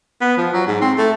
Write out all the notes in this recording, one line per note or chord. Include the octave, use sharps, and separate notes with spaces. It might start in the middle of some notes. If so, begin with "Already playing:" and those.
B3
F3
F#3
G#2
C4
A3